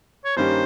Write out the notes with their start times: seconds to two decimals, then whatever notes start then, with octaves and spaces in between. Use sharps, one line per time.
0.25 C#5
0.36 G2 D#3 A#3 C#4 G4 C5